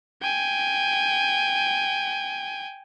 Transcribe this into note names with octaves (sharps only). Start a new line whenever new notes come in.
G5 G#5